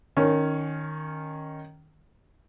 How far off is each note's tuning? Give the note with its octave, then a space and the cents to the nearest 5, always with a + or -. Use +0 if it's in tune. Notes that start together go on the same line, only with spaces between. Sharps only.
D#3 -10 C#4 +0